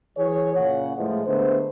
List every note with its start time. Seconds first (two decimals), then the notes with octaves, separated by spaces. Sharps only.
0.17 E3 F#3 G#4 C#5
0.55 A#2 C#3 F#5
0.96 A2 E3 F3 G#3
1.26 D3 G#3 A3 B3 C5